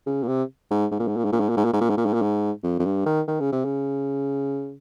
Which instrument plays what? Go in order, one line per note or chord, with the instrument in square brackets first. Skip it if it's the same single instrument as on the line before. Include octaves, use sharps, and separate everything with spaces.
[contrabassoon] C#3
A#2
C3
G#2
G#2
A#2
G#2
A#2
G#2
A#2
G#2
A#2
G#2
A#2
G#2
A#2
G#2
A#2
G#2
A#2
G#2
F2
F2
G2
D#3
D#3
C#3
C3
C#3